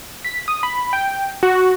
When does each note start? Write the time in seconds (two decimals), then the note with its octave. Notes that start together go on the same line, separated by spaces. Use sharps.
0.24 B6
0.48 D#6
0.63 B5
0.93 G5
1.43 F#4